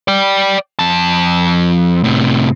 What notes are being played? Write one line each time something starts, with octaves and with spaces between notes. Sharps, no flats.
D5 G5
F2 A5
A2 C3